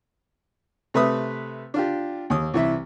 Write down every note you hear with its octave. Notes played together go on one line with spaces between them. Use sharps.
C3 A3 B4 E5 B5 D#6
D4 F4 G4
D#2 D#6
C2 E3 E5